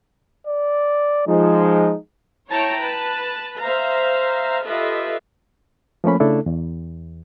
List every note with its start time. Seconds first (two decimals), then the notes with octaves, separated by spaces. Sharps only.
0.47 D5
1.27 F3 G#3 D#4
2.49 E4 C#5 G5 A5 A#5
2.78 B4 A5
3.59 C5 E5 F5 A#5
4.64 F4 G4 A4 B4 D#5 E5
6.04 F3 A3 A#3 C#4 B5
6.20 C#3 A3 D4 E4 A4
6.46 E2